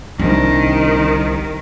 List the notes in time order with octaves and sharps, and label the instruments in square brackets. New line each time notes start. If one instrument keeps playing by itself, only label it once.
[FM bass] C2 [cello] D#3 [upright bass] D4